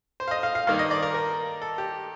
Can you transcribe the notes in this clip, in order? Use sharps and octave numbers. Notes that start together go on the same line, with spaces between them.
C5
F5
D#5
F5
F5
G2 D#3 A#3 D#4 F5
D#5
D5
A#4
A#4
A4
G4